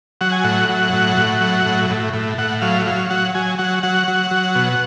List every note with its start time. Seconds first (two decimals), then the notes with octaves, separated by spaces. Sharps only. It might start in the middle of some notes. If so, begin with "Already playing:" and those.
0.21 F#3 F#5
0.32 G#5
0.44 A2 F#5
0.69 F#3
0.93 A2
1.17 A2
1.41 F#3
1.65 A2
1.90 A2
2.13 A2
2.38 A2 F#5
2.61 F#3 F5
2.86 F#3 F5
3.10 F#3 F#5
3.35 F#3 G#5
3.58 F#3 F#5
3.83 F#3 F#5
4.08 F#3
4.31 F#3
4.55 B2